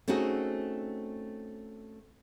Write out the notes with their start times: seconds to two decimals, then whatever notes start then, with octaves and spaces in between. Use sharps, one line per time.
0.08 A3 C4 C#4 D#4 F#4 G#4